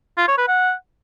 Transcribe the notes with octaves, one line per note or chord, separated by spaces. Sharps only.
F4
C#5
B4
F#5